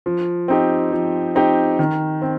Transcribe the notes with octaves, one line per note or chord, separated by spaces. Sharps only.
F3
C4 D#4 G4
F3
C4 D#4 G4
D#3
C4